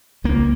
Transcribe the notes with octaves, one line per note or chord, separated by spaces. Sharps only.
C#2 A#3